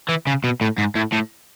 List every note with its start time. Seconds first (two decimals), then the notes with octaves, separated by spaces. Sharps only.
0.09 E3
0.27 C#3
0.44 B2
0.61 A2
0.78 G#2
0.96 A2
1.13 A2